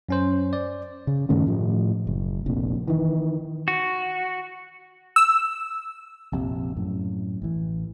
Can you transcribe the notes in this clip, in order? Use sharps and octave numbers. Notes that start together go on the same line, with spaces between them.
F#2 C#4 C5
D5
C#3
G2 D#3 A3 C#4
A2 F3
F#1
F1 A#1 F2
D#3 E3
F#4
E6
A#1 F2 C3
F#2 A2
A1 E3